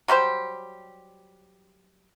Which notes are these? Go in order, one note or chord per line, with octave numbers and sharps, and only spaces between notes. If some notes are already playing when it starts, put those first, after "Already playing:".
F#3 G3 G4 C5